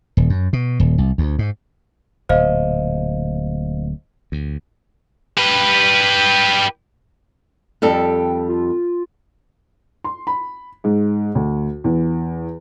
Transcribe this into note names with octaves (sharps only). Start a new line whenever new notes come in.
D#1
F#2
B2
D#1
C2
D2
G#2
D1 A#2 C5 D#5 F5
D2
G4 B4
F2 G3 A4 G5
F4
C6
B5
G#2
D2
E2